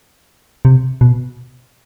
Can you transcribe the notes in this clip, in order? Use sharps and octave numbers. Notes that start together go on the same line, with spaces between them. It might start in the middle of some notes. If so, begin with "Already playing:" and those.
C3
B2